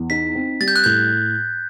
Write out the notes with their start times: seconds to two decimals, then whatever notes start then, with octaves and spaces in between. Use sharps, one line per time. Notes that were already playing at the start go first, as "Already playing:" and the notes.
Already playing: E2
0.10 D#4 B6
0.35 C4
0.60 G3 A6
0.68 G6
0.76 F#6
0.84 A2 G6